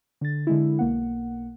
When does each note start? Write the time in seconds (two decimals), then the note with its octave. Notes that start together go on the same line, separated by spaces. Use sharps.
0.21 D3 A6
0.47 D3 G#3 E4
0.79 B1 A#3 F#5